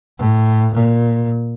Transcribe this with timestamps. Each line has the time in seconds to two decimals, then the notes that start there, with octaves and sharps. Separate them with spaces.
0.19 A2
0.74 A#2